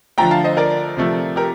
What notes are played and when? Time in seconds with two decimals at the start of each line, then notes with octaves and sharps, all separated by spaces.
0.18 D3 F3 A3 G5 A#5
0.31 F5 A5
0.44 C5 D#5
0.57 A#4 D5
0.97 C3 F3 A3
1.36 G4 A#4